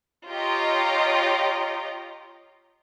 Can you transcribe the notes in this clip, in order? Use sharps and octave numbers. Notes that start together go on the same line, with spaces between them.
F4 G4 C#5 D#5 A#5